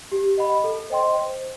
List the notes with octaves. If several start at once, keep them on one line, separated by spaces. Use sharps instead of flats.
G4
D#5 F#5 B5
A4
C5 D#5 G5 C6
C5